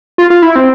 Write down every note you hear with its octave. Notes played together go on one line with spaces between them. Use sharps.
F4
F4
E4
C4